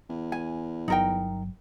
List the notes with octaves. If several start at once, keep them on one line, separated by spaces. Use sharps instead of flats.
E2
G#5
G1 F#3 D#4 A#4 G5